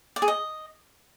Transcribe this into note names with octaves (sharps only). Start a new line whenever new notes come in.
D5
G#4
D#5